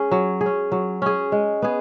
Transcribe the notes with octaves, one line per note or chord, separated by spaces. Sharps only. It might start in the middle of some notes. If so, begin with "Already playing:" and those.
Already playing: C#4 G#4
F#3
G#4
C#4
F#3
C#4 G#4
G#3
B3 G#4